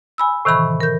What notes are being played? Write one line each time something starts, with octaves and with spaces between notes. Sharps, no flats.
G#5 B5 E6
A2 C3 D#3 E3 B5 C#6
A#4 G6